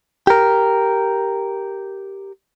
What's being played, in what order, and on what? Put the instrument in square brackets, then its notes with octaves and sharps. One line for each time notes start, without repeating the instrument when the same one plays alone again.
[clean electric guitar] G4 A#4